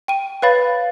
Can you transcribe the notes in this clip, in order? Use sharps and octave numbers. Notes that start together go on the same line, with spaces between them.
G5 D#7
B4 C#5 F5 B5 A6